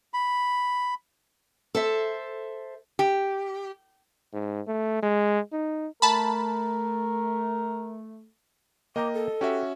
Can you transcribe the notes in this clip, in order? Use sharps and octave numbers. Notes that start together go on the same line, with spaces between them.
B5
A4 C5 E5
G4
G#2
A3
G#3
D#4
A3 A#4 A5 B5
A#3 D#5 G5 A#5 D6
A4
C#4 F#4 G4 E5